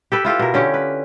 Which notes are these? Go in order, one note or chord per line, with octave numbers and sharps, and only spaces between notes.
G4 A4 B4
E4 F4 G4 A4
B2 A#4
D3 C#4 G4
B4